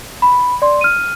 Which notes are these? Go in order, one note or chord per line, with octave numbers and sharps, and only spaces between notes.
B5
D5 C6
F6 D#7